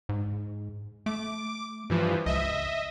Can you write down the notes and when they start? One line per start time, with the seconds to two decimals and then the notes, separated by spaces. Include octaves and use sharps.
0.09 G#2
1.06 A3 D6
1.90 G2 E3 F3
2.26 C#2 D#5 E5